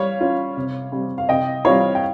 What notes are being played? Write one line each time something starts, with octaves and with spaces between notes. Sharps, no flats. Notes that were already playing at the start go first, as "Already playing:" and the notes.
Already playing: G3 C#5 F5
C#4 F4
C3
G3 C4
F5
C3 D#5 G5
G3 C4 F4 C#5 F5
G5